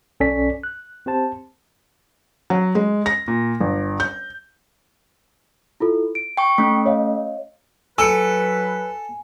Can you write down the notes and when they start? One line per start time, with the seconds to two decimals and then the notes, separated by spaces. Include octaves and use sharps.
0.20 B1 C#4 A4 D5 B6
0.63 F#6
1.06 C4 G4 C5 A5
2.50 F#3
2.75 G#3
3.06 A#6
3.28 A#2
3.60 G1
4.00 G6
5.80 E4 F4 A4
6.15 D7
6.37 G5 C#6
6.58 A3 C#4
6.85 C#5 D#5 F5
7.98 F#3 A4 B4 G#5 E6 C#7